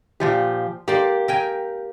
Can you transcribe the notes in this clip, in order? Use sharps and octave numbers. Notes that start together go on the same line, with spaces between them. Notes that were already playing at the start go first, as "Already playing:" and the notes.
A#2 F3 G4
A#3 G4 D5 C6
A#4 G5 G#5